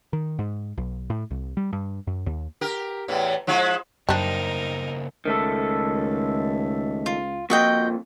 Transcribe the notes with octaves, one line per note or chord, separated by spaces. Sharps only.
D#3
G#2
B1
A2
C2
G3
G2
F#2
D#2
G4 A#4
E2 A2 E3
F3 G#3 E4
F#2 C#3 G3 A#3 D4 D#4 A#4 C5
C#2 D#3 A3 A4
F4
F2 A#2 F#4 D#5 G5